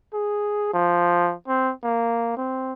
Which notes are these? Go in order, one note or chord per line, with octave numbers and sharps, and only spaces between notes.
G#4
F3
C4
A#3
C4